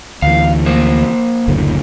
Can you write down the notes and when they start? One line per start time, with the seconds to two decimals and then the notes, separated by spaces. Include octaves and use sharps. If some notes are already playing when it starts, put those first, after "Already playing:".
0.22 D2 E3 F5
0.66 A#3 A#4 C5
1.48 F#1 D2 A2